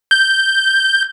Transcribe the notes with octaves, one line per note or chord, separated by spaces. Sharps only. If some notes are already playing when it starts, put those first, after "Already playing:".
G6